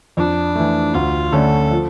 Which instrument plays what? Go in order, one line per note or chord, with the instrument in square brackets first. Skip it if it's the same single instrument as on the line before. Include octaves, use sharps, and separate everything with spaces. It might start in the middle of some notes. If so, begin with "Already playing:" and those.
[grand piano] F2 [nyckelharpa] D4
[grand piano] E3 A3
[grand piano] D2 [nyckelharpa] F4
[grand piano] D3 A3 C#4 [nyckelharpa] A4
[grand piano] F3